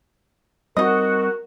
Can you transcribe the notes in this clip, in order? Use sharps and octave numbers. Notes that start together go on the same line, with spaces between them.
G3 C4 D#4 F#4 A#4 D#5